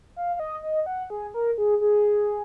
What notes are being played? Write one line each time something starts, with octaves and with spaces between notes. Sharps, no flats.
F5
F5
D#5
D#5
F#5
G#4
A#4
G#4
G#4